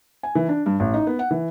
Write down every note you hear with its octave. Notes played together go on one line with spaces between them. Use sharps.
G#5
E3
D4
G2
A1
D#4
B3
F#5
E3